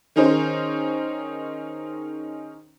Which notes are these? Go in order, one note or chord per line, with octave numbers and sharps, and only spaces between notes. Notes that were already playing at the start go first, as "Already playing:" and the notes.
D#3 C#4 D#4 G#4 C5